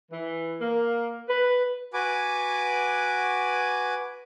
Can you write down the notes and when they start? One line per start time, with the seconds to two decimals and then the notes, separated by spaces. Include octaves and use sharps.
0.11 E3
0.60 A#3
1.28 B4
1.94 F#4 B4 G#5 D6